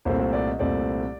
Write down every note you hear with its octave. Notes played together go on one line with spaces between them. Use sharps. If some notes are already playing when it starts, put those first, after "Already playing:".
C2 A#2 A3 C4 C5
C5
D5
D#5
C2 A#2 A3 C4 D5